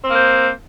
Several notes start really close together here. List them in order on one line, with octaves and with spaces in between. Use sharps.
C4 A#3 C5